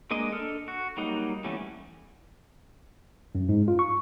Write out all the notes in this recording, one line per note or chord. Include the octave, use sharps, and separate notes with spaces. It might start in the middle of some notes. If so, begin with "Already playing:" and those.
G#3 A#3 D4 D#5
D4 A4 D#5 F6
F#4
F#3 G3 A#3 D#4
E3 G3 A3 B3 C#4
F#2
G#2
F4
C#6